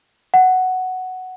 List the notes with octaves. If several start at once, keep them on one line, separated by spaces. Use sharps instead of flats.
F#5